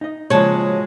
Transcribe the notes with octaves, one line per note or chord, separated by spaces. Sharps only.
D#4 D#5
A#2 C#3 F3 F#3 G#3 C#5 A5